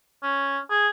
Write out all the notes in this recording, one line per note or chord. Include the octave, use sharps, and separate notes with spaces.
C#4
G#4